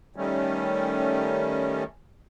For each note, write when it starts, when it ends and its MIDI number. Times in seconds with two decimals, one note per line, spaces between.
0.16 1.84 51
0.16 1.84 55
0.16 1.84 57
0.16 1.84 61